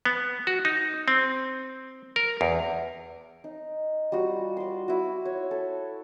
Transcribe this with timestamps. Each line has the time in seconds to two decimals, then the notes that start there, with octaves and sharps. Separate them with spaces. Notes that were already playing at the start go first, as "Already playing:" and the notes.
0.06 B3
0.47 F#4
0.65 D#4
1.08 C4
2.16 A#4
2.41 E2
3.44 D#4
4.12 G3 F4 F#4
4.57 D5 C6
4.88 E4 F#4
5.25 C#5
5.51 A4